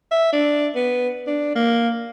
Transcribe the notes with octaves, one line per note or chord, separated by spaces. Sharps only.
E5
D4
B3
D4
A#3